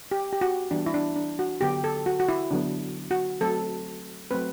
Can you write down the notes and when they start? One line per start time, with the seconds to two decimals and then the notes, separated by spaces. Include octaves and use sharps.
0.11 G4
0.33 G4
0.41 F#4
0.71 E3 G3 B3 D4
0.86 E4
0.94 D4
1.16 D4
1.39 F#4
1.61 D3 F#3 B3 G4
1.84 A4
2.06 F#4
2.20 F#4
2.29 E4
2.51 D3 F#3 B3 D4
3.11 F#4
3.41 F#3 A3 C4 A4
4.31 F#3 A3 C4 B4